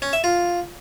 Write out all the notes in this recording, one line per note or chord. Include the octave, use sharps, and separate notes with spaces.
C#4
E5
F4